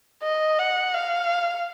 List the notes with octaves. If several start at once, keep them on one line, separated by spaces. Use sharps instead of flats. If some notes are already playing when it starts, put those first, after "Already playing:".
D#5
F#5
F5